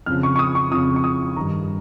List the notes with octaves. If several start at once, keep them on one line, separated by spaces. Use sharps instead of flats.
F2 C#3 F3 F6
C#6
C#6
D#6
C#6
F2 C#3 F3 D#6
C#6
D#6
G2 D#3 A#5